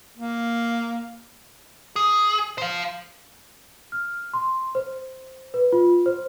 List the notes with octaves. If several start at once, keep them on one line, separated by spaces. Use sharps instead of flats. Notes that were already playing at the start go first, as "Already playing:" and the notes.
A#3
G#4
C5 F5
F6
C6
C5
B4
F4
C5